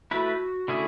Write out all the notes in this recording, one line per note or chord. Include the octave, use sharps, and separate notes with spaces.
A3 E4 F#4 B4
D3 A3 C#4 E4 G#4